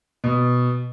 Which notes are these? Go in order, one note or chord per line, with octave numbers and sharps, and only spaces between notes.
B2